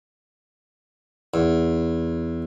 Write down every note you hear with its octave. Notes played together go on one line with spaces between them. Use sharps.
E2